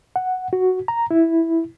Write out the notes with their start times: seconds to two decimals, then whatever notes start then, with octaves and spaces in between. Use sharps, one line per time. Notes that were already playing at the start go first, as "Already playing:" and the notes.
0.16 F#5
0.53 F#4
0.88 A#5
1.11 E4